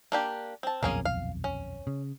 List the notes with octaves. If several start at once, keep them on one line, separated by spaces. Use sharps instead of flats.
A#3 D4 G4
C4 A5
D#1 B1 F2 A#3 C#4 G#4
F5
C#4
C#3